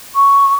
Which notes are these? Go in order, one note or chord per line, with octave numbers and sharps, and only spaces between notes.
C#6